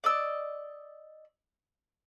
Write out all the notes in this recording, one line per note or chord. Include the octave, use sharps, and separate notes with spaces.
D5 D#5 E6